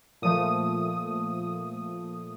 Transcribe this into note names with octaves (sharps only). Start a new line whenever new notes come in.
A#2 F3 A3 D#6